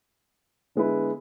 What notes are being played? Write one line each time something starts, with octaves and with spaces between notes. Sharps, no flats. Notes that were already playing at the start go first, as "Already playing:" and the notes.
D3 G#3 B3 E4 B4